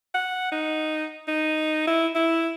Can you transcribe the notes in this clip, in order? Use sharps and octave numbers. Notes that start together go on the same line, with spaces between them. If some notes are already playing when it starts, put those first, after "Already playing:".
F#5
D#4
D#4
E4
E4